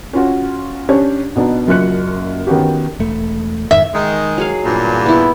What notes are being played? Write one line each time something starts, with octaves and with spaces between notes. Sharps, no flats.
C#4 F4 F#4
C#4 D4 G4 C#5
B2 B3 D4 D#4
F#1 F#2 F4 F#6 C#7
D#3 B3 C#4 F#4 G4
E1 A3
F2 G#2 D#3 E5
D#3 G#3
F#3 G#4 F5
E2 G2 A#2
B3 E4